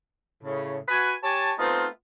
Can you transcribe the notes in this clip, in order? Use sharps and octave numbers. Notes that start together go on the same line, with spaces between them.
A2 C#3
F#4 B4 G#5
G4 C#5 G#5 A5
A3 B3 C4 D#4 F4